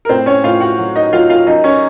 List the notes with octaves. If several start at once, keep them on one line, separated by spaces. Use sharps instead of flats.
A#4
A2 C4 C5
C#4 C#5
A2 F4 F5
F#4 F#5
F#3
D#4 D#5
F#3 F4 F5
F4 F5
F#2 D#4 D#5
C#4 C#5